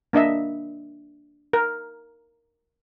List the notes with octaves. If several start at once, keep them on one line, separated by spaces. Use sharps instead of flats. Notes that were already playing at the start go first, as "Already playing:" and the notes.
A#3 D4 D#5 E5
A#4